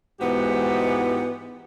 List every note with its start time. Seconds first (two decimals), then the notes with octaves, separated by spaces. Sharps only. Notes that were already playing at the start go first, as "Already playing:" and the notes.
0.21 G#2 E3 G#3 B3 F#4 G4